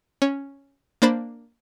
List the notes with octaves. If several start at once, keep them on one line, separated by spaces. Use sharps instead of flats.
C#4
A#3 D4 C5 B5 A6